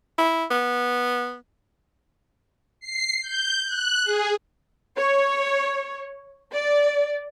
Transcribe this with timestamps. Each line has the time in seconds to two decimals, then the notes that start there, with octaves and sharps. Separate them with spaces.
0.18 E4
0.51 B3
2.80 C7
3.22 G6
3.65 F#6
4.04 G#4
4.97 C#5
6.52 D5